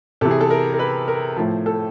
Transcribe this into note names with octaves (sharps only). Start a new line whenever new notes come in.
C3 E3 A4
G#4
A4
A#4
A#4
B4
A#4
A2 F3
A4